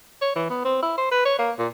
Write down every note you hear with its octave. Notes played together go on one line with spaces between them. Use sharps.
C#5
E3
B3
C4
E4
C5
B4
C#5
A#3
A#2